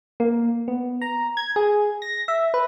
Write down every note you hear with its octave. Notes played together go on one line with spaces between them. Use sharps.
A#3
B3
A#5
G#6
G#4
A#6
E5
B4